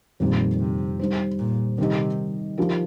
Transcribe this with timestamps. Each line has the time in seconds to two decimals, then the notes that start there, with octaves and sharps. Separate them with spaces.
0.20 F2 A#2 D#3 G3 C4 G4
0.60 C3
0.99 G3 D#4 C5
1.39 A#2
1.78 C3 D#3 G3 D#4 G4 D#5
2.58 F3 D#4 G4 A#4